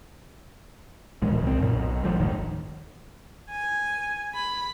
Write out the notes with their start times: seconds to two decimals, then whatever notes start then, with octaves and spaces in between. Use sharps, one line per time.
1.22 D1 A#1 E2 G#3
1.43 C2 C4
1.59 F#2 A#2
1.71 B1
2.04 A1 A2 F3 G3
2.19 G1 D#2 A2 D#3
3.50 G#5
4.35 B5